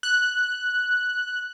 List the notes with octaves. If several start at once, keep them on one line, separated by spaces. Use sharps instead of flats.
F#6